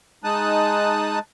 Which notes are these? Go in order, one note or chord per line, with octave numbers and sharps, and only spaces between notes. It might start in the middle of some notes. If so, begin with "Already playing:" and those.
G#3 D#4 A5 D#6 F#6